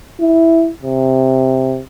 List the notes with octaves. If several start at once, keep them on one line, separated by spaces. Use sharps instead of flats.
E4
C3